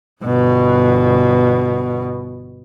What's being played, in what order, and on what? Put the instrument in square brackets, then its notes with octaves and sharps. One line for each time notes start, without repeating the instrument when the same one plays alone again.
[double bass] G1 B2